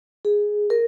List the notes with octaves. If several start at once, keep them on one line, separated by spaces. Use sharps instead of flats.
G#4
A#4